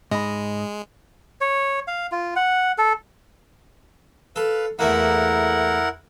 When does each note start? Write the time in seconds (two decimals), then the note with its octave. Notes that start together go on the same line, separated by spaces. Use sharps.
0.11 G#2 G#3 D#5 B5
1.41 C#5
1.88 F5
2.12 F4
2.36 F#5
2.78 A4
4.36 A4 B4 F5
4.79 E2 A3 A#3 E4 A#4 F#5